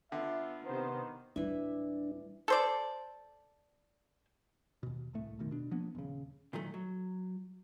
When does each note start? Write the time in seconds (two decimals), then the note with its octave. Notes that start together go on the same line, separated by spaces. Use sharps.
0.12 D3 B3 F4 E5
0.65 C3 D#3 B3 C5
1.36 D1 E3 G3 D4 E5
2.48 A4 C5 D5
4.83 D#2 B2
5.13 D1 C2 A2 A3
5.39 F1 B2 D#3
5.51 B2 D4
5.71 F3 A#3 B3 D4
5.95 D#1 C#3
6.53 A#2 D#3 F#3 A3
6.74 F#3